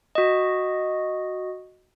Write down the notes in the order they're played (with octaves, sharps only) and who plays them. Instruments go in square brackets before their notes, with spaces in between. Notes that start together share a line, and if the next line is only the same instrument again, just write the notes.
[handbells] F#4 D#5